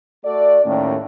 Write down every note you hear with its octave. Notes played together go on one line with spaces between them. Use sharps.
A3 F#4 A4 D5
D#2 A2 C#4